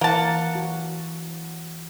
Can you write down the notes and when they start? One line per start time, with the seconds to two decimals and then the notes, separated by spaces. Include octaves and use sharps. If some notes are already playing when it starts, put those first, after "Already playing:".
0.01 E3 A#3 F#5 A5
0.55 F#4